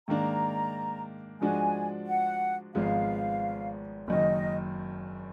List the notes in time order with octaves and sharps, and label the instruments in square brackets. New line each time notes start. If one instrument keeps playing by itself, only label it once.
[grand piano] G#2 D#3 A#3 D4 [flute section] A#5
[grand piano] G#2 F3 G#3 D4 F#4 [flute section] G#5
[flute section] F#5
[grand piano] G#1 G#2 F3 G#3 B3 [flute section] F5
[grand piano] F#1 F#2 D#3 [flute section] D#5